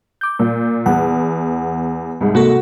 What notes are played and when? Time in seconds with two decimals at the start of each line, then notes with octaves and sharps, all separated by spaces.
0.21 D6 G6
0.39 A#2
0.86 E2 F#5
2.21 C2 G#2
2.35 C3 A#3 F#4 A4